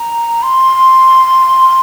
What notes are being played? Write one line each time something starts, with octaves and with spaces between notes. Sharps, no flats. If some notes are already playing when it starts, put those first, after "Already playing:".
Already playing: A#5
C6